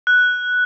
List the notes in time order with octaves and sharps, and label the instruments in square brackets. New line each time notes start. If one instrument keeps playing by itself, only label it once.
[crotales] F#6